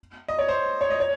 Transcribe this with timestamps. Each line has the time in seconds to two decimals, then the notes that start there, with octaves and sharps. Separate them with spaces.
0.28 D#5
0.39 C#5
0.49 C5
0.81 C#5
0.90 D#5
1.00 C#5